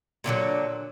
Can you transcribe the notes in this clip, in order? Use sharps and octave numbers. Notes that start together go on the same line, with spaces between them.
A#2 D3 E3 F#3